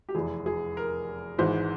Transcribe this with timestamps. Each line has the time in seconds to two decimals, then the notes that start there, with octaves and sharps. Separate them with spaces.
0.09 G4
0.14 F1 E2 E3 G#4
0.46 G#4
0.77 A#4
1.38 G#1 G#2 E3 G#3 C5